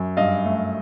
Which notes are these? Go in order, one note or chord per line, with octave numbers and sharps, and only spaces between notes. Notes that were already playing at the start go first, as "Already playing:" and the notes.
Already playing: F#2
G2 D#5 F5
A3